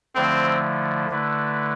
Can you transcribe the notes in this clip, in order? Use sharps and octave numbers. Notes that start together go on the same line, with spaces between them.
D3 F3 A3 C4 E4
D3 A3 E4 B4